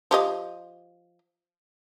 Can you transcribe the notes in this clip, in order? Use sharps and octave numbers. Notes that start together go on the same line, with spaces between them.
F3 G4 D#5